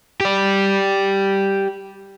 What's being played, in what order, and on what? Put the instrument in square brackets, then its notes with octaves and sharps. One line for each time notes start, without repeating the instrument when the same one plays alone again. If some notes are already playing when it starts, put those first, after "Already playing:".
[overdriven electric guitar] G4 D5